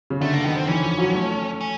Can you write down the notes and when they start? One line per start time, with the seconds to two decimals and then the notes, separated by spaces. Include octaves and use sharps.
0.10 C#3
0.21 D3 A3
0.33 A#3
0.44 D#3 B3
0.56 C4
0.67 E3 C#4
0.83 F3
0.98 F#3
1.14 A3
1.61 C#4